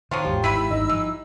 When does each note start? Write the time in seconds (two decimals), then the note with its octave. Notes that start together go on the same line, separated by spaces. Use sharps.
0.11 D#3 F3 F#3 C4 F4
0.24 A1 E2 G#2 G4
0.44 G#1 G#2 D#3 E4 B4 B5 E6
0.71 G#1 G2 D#4
0.89 E3 F3